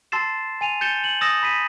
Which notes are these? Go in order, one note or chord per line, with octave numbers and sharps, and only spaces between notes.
A5 C6 E6 A6 C7 E7
G#5 D#7 F7
G6 A6 C#7 E7 G7
F#7
D#6 E6 A6 A#6 E7
B5 B6 D#7